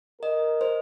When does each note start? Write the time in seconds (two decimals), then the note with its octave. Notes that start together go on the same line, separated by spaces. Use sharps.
0.22 A#4 D#5
0.61 C5